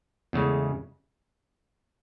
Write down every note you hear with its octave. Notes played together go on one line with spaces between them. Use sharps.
E2 C#3 G#3 A3